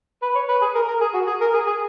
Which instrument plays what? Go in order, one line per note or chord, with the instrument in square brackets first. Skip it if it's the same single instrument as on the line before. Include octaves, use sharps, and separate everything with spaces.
[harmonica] B4
C#5
B4
G#4
A#4
A#4
G#4
F#4
G#4
A#4
G#4
G#4